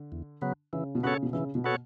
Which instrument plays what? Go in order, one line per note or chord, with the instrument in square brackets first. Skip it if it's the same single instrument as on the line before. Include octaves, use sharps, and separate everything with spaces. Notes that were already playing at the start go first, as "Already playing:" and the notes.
Already playing: [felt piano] D3
[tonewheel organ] E2
C#3 F#3 B3
[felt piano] C#3 [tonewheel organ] E3
[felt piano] B2
[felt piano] C#3 [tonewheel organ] B3 F#4 A4 C#5
[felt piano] B2
[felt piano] C#3 [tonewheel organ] E3
[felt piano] B2
[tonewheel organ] B3 F#4 A4 C#5